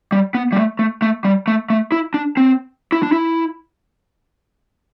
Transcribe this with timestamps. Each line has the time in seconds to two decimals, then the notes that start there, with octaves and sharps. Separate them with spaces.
0.12 G3
0.34 B3
0.52 G3
0.56 A3
0.79 A3
1.02 A3
1.25 G3
1.48 A3
1.70 A3
1.92 E4
2.14 D4
2.37 C4
2.92 E4
3.03 D4
3.12 E4